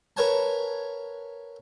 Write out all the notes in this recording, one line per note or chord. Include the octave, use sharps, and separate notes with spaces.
A#4 B4 C#5 F#5 G#5 A5